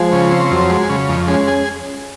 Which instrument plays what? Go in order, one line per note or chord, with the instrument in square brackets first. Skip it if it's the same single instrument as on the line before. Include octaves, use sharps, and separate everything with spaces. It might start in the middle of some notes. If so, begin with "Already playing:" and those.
Already playing: [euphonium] F3 [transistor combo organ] G#3
[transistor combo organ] C#3
C4
[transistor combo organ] F2 [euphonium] F#3
[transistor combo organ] G#3
C#3
F2
[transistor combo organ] G#3 [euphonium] C#4
[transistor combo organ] G#4